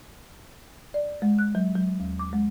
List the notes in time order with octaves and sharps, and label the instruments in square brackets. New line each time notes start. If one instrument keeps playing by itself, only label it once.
[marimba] D5
G#3
F#6
F#3
F#3
D#2
D6
G#3